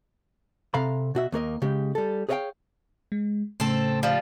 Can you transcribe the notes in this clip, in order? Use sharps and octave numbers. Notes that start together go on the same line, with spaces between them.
C3 A4 F5 A#5 B5
B2 F#4 E5
D#2 A#3 A#4 D#5
C#3 G#3 G4
G3 A4
G#4 B4 C#5 D#5 F5 G5
G#3
A2 C#3 A3 C4 A4
F3 G3